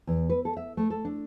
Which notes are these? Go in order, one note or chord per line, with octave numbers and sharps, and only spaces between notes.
E2
B4
A4
E5
A3
A4
D4